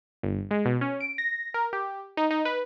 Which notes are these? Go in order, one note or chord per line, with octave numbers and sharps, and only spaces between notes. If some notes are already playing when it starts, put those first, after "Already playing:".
G1
G#3
B2
C#4
D7
A#6
A#4
G4
D#4
D#4
B4